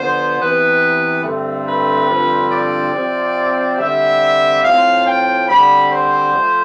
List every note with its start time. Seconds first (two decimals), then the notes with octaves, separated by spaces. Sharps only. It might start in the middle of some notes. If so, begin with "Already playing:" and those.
Already playing: D3 F3 B3 C5
0.39 C3 E3 B3 B4
1.24 G2 D3 A3 C4
1.67 B4
2.09 G2 D3 F3 C4
2.51 D5
2.93 C3 F3 C4
3.78 D3 G3 C4 E5
4.63 A2 F3 C4 F5
5.06 G5
5.48 D3 G3 C4 B5
5.91 C5
6.34 F3 A3